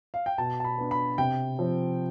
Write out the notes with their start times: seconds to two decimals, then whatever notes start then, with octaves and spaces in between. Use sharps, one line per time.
0.14 F5
0.26 G5
0.38 B2 A5
0.60 A5
0.64 B5
0.78 B3 D4
0.91 B5
1.18 C3 G5
1.59 F3 C4